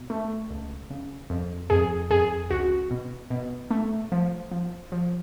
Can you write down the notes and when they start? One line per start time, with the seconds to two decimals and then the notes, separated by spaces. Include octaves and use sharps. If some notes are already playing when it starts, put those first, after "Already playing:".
Already playing: B2
0.10 A3
0.50 C#2
0.90 C#3
1.30 F2
1.70 F2 G#4
2.10 F2 G#4
2.50 C#2 F#4
2.91 B2
3.30 B2
3.71 A3
4.12 F3
4.51 F3
4.92 F3